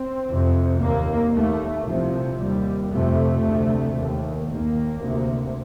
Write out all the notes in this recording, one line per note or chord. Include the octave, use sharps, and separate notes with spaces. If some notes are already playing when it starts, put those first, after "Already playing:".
Already playing: C4
F2 C3
D#2 A#3
D#2 A3
C2 C3 F3
D#2 G3
F2 C3 A3
D2 C3
D#2
D#2 A#3
D2 C3